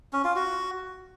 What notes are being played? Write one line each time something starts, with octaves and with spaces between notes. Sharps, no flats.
C#4
F4
F#4